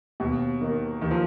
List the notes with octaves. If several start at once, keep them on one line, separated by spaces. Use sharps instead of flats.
D#2 B2
D#3 A#3 D#4
D#2 D#3
F3